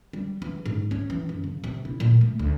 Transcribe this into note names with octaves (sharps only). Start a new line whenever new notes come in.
G3
E3
G#2
C#4
E3
F#2
C#3
C3
E4
A#2
A3
D2